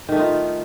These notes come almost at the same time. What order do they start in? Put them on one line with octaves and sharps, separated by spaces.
D#3 A3 D#4 F4